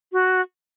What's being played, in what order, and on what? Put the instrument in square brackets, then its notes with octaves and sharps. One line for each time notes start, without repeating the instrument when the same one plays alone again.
[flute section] F#4